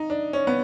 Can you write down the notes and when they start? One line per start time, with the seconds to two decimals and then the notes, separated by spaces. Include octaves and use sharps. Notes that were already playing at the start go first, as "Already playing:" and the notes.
Already playing: D#4
0.10 D4
0.33 C#4
0.47 B3